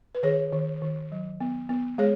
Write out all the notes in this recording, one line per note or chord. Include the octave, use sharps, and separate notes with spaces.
B4
D#3 G#4 C#5
D#3
D#3
F#3
B3
B3
G#3 G#4 C#5